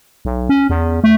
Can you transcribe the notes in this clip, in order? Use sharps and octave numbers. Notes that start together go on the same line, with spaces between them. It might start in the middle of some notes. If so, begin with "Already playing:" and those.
B1
C#4
E2
A3